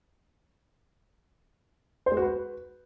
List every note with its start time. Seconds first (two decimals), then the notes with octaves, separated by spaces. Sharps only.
2.06 C5
2.12 G#3
2.17 F#4
2.22 B4